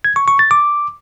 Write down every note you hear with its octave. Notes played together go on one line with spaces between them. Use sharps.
G#6
C#6
C#6
A6
D6